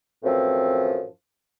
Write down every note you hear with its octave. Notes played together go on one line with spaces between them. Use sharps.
F#2 A2 E3 F3 C4